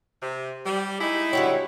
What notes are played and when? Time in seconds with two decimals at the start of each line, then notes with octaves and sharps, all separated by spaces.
0.21 C3
0.66 G3
0.99 G#3 D#4 E4
1.33 D3 F#3 G3 C#5